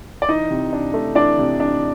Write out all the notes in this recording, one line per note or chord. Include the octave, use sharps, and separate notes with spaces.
D5
E3 D#4 D#5
C3
D4
A3
E3 D4 D5
C3
D4